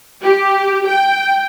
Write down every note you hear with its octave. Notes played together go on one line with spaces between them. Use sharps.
G4
G5